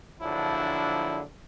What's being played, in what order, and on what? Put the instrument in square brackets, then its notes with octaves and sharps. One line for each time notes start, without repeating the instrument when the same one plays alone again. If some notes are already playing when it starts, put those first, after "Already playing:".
[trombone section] A#1 D3 F3 F#3 D4 E4